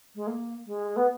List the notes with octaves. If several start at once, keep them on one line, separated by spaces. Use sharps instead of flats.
G#3
A#3
G#3
B3